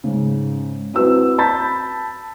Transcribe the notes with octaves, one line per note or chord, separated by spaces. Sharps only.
G#2 C#3
C4 E4 F#4 B4 E6
A5 B5 G6 A6 B6